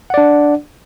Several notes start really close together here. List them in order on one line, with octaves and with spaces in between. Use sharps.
F#5 D5 D4